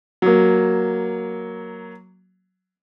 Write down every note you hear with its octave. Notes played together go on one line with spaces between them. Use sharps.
F#3 A#3